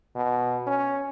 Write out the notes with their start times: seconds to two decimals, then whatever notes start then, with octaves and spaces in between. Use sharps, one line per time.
0.16 B2
0.67 C#4